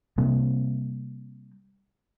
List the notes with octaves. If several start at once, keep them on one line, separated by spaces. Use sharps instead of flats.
C3 G3 A#3 C4